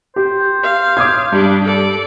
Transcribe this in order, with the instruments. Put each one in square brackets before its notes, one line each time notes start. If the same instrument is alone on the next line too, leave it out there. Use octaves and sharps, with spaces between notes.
[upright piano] G4 [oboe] C5
[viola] F5
[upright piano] D6 D#6 G#6
[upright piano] G2 [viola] G3 D4
[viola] A4 D5